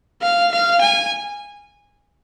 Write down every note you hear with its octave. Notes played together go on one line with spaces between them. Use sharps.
F5
F5
G#5